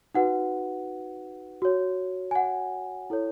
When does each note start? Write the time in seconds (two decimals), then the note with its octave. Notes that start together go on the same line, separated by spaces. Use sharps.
0.15 D#4 F#4 B4 F#5
1.62 F#4 C#5
2.31 G#5
2.35 F#5
3.10 E4 A4 C#5